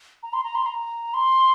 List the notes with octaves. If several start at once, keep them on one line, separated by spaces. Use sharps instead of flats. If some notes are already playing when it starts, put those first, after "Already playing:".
A#5
C6
A#5
C6
A#5
C6